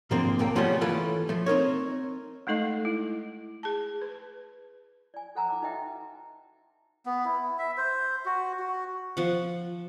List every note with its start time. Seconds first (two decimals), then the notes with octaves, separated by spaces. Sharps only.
0.11 G#2 D3 F3 G#3 A#3 C4
0.39 B1 G#2 A#3 A4 G5
0.55 C#3 F3 G3 A3 B3 C#4
0.81 E3 A3 F4 A4 B4
1.29 F3 A3
1.46 C4 D#4 A#4 C#5
2.47 G#3 A3 D#4 A4 D#5
2.85 E4
3.63 G#4 A5
4.02 B4
5.14 D5 G#5
5.35 A4 C5 F#5 G#5 A#5 E6
5.48 D#4 F#5 A5 D6 E6
5.62 D#4 F#4 B4 D#5 E5 G5
7.06 B3
7.25 E4
7.59 E5
7.77 C5
8.25 F#4
8.59 F#4
9.17 F3 F#5